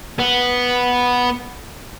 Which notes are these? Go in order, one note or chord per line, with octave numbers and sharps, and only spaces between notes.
B3